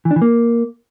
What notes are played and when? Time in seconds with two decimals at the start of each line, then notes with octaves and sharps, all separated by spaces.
0.05 E3
0.11 D4
0.16 E3
0.22 A#3